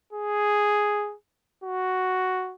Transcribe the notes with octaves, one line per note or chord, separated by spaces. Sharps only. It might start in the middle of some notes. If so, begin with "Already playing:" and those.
G#4
F#4